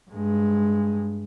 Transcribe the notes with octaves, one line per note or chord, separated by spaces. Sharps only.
G2 G#3